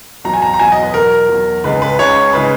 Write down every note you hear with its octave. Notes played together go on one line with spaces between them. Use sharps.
E2 B2 F#3 A#5
G#5
A#5
A#5
E2 B2 F#3 G#5
D#5
B4
E2 B2 F#3 A#4
E2 B2 F#3
C#2 C#3 G#3 D#4 B4
B4
C#2 C#3 G#3 D#4 C#5
C#3 G#3 D#4 B4